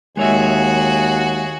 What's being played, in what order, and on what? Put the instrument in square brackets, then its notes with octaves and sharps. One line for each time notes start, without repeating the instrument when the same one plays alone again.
[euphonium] D#2 [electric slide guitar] G#3 C#5 E5 [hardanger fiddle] F#4 G#4